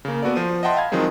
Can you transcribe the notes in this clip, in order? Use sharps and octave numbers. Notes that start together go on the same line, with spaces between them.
C#3 A#3
B3 F#4 A4 D5
F3 C5 D#7
D#5 E5 F#5 G5 A5 C6
F5 B5 G#6
D#3 F3 F#3 G#3 C4